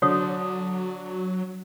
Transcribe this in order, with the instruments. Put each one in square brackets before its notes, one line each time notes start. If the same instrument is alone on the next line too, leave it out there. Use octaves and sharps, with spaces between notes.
[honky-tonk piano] D3 [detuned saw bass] F#3 [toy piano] F#4 C#5 D#6